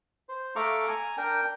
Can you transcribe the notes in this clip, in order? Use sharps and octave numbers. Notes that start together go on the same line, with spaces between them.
C5
A3 A4 F5 A#5 C#6 D6
G#5 A#5
D4 A#4 G5